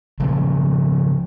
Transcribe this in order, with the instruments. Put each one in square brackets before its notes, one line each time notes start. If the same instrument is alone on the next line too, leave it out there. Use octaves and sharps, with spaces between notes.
[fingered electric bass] C#3 F3 G3